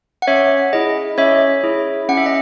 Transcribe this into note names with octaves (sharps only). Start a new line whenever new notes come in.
F#5
C#4 C#5 E5
E4 G#4 D#5
C#4 C#5 E5
E4 G#4
C#4 F#5
E5
D#5 F#5